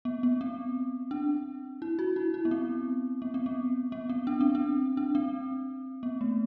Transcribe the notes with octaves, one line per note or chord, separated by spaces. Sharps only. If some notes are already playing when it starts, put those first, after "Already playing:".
B3
B3
C4
D4
E4
F#4
E4
E4
B3
C4
B3
C4
B3
B3
C4
D4
C4
D4
D4
C4
B3
A3